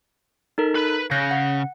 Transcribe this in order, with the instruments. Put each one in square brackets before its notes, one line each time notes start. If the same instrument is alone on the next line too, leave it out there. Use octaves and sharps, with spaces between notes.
[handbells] D#4 A4 A#4
[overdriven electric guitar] B4 B5
[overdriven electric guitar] C#3 [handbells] F#6 G6 A#6
[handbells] F#5